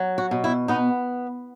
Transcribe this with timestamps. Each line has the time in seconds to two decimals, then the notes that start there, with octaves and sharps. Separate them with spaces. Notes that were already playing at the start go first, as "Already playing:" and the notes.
Already playing: F#3
0.18 F#4
0.31 B2
0.44 E4
0.68 B3 D#4